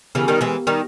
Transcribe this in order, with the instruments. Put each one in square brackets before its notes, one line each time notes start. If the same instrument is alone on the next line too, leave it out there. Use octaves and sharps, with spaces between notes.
[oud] C#3 E3 [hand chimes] B3 G4 A#4
[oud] D#3 G3
E3 G#3
D#3 G3